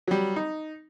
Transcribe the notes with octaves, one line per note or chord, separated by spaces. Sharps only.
F#3 G3
D#4